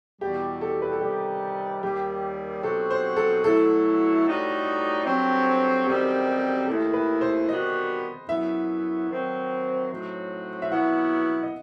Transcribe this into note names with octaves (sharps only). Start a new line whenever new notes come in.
E2 B2 G3 G4
A4
B4
A4
C3 D#3 G3 D#4 G4
D#2 D#3 G3 G4
B2 F#3 C4 D#4 F#4 A4
C5
A4
B2 F#3 A3 E4 A4
A2 G3 D#4 F#4
G2 F#3 C4
F#2 D#3 G3 C4 D#4 G4
D#2 D#3 A3 E4 A4
B4
C5
D#3 G3 B3 F#4 D#5
F#2 F#3 B3 E4 E5
D#3 F#3 C4
A2 F#3 C4 D#4 F#4
E5
B2 F#3 B3 E4 F#5
D#5